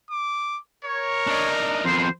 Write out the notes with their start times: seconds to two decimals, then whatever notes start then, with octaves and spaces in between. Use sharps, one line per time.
0.10 D6
0.84 A#4 C#5
1.27 D4 D#4
1.84 F2 B3 C5